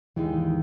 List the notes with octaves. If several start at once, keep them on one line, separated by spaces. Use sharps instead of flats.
D#2 D#3 E3 G#3 D#4